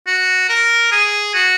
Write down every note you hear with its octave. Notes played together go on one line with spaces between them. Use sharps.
F#4
A#4
G#4
F#4